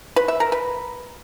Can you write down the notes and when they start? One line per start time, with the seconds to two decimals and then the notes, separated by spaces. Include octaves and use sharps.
0.16 B4
0.28 E5
0.40 A#4
0.52 B4